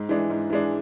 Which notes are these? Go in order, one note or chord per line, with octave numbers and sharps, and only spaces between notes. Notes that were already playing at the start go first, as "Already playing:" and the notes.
Already playing: G#2
E3 G#3 D4
G#2
E3 G#3 D4